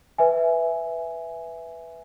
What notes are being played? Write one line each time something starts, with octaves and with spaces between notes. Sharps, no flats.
B4 E5 G#5